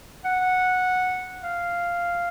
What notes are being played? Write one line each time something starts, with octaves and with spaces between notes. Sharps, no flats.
F#5
F5